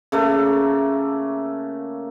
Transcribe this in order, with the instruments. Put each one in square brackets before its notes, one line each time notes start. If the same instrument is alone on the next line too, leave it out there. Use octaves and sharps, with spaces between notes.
[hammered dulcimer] C#3 A3 A#3